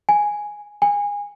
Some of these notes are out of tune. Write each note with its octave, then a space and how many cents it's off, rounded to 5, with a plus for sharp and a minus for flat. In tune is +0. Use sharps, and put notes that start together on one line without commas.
G#5 +0
G#5 -25